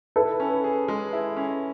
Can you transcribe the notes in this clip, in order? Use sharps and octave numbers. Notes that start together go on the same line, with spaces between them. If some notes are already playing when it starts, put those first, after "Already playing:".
E4 A4 B4
C#4
G#4
G#3
E4
C#4